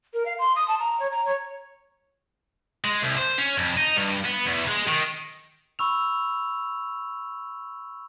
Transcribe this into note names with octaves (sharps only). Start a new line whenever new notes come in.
A#4
F5
C6
D#6
A5
A#5
C#5
A#5
C#5
G#3
C2
C5
C#4
F2
D#4
G2
B3
E2
G#3
D#3
B5 C#6 E6 F7